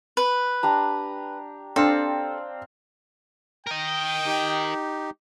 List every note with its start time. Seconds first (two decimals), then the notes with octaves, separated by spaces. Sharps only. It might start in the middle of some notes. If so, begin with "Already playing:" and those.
0.17 B4
0.63 D4 G4 A#5
1.76 C4 D4 A4 F5
3.67 A#4 D#5 G5
4.26 D#4 G4